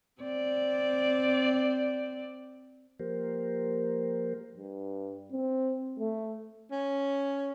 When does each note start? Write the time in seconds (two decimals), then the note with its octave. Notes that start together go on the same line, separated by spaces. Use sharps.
0.22 C4 D5
3.00 F3 A#3 G4 A#4 C5
4.57 G2
5.32 C4
5.99 A3
6.71 C#4